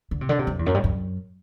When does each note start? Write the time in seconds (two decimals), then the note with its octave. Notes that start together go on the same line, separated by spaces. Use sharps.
0.11 D3
0.21 C3
0.29 D3
0.39 C3
0.47 F#2
0.59 E2
0.66 F#2
0.74 G2
0.84 F#2